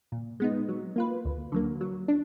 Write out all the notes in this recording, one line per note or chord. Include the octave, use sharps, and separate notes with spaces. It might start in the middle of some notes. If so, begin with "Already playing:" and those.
A#2
G#3 B3 D#4
F#3
A#3 F4 B4
D2
D3 F#3 A#3
F#3
D4